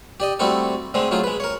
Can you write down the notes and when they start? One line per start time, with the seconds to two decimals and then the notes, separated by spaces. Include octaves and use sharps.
0.20 G4 D5 D#5
0.40 G3 A3 C4 E4 F#4 A4
0.94 D3 G#3 A3 C4 C5
1.11 F#3 A3 D#4 F4 G#4
1.24 G#3 B4
1.40 A#4 C#5